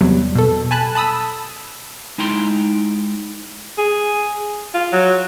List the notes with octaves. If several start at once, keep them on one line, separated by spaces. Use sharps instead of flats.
E2 C3 F#3 G3
B2 A4
G#5 A5 B5 F#6
A5 B5 D#6 E6
G#3 D#4 E4 G5 A#5 C6
G#4
F4
F#3